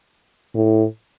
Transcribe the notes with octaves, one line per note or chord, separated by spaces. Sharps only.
A2